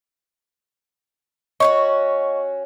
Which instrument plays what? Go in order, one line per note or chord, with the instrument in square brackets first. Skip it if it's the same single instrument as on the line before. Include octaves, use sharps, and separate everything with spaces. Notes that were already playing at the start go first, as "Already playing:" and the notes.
[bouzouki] C#4 D#4 F#4 [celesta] D#5 C#6